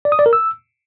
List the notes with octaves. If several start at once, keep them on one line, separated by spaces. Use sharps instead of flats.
D5
D#6
D5
A#4
E6